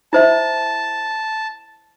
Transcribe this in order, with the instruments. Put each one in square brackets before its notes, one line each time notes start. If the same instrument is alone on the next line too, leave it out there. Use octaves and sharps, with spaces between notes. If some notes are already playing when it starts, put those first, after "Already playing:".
[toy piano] E4 C5 E5 [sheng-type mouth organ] A5